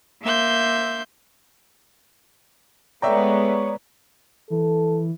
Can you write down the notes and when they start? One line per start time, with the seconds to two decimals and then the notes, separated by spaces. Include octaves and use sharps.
0.22 A#3 E5 C6 G6
3.02 G#3 A3 B3 C#5 D5 E5 G5 A#5
4.50 E3 A4